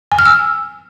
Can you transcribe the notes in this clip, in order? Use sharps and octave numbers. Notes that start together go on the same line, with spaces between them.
G#5
F6
E6